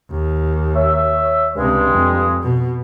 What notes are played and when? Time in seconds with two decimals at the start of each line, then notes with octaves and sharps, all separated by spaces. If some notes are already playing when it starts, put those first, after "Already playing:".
0.11 D#2
0.75 C#5 E5
1.57 C#2 G2 C3 G#3
1.92 F2
2.43 B2